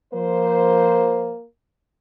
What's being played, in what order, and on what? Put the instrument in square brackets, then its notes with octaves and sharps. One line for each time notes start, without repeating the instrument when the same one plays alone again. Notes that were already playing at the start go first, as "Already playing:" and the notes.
[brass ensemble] F3 C5 [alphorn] A#3